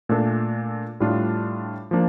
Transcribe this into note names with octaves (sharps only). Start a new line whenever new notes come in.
A#2 A3 D4 A4
A2 G3 D4 F4
F3 A#3 D4